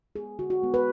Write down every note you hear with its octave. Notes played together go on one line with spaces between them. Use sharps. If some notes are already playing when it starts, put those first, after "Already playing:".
G#3 B3 G#4
D3 F#4
F#4
G#3 B3
B4